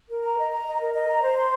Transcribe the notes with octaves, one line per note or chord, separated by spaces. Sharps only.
A#4
A#5
D#5
A#5
D#5
A#4
D#5
A#5
C5
C6